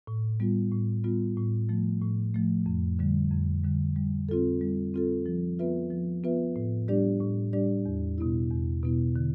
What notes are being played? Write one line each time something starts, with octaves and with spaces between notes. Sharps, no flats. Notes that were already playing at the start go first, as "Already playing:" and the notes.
A2
G3 B3 F4
A2
G3 B3 F4
A2
F3 A3
A2
F3 A3
F2
D3 G3
F2
D3 G3
G3
C4 F4 A4
G3
C4 F4 A4
F3
B3 F4 B4 E5
F3
B3 F4 B4 E5
A2
G3 D4 G4 D5
A2
G3 D4 G4 D5
E2
B2 B3 E4
E2
B2 B3 E4
D3